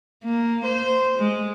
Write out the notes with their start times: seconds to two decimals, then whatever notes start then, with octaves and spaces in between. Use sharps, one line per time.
0.24 A#3
0.65 C5
1.18 G#3